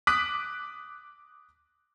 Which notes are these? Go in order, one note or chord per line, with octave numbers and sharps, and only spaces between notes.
D6 D#6 F#6 B6 F#7